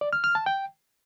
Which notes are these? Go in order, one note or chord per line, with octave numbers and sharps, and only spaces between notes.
D5
F6
F6
A5
G5